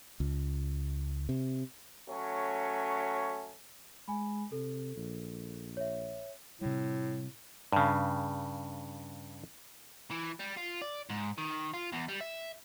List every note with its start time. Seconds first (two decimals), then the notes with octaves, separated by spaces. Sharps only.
0.20 C#2
1.29 C3
2.09 F#3 A3 C#4
4.08 G#3 G#5 B5
4.52 C3 A4
4.96 A#1
5.77 C#5 E5
6.61 A2 C3 G3
7.73 G2 C#3
10.11 E3
10.39 G3
10.57 F4
10.81 D5
11.10 G#2
11.38 D#3
11.74 F4
11.93 E2
12.09 G3
12.21 E5